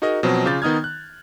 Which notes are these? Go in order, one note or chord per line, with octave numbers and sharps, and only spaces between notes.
D#4 F#4 G#4 A#4 D#5
B2 F3 F#3 C4
C#3 F4 D6 G6 A6
D#3 B3 D#4 D#6 F6 G#6
F#6